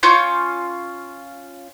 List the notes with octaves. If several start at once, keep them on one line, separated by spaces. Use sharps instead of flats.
C#4 F4 C#6 G6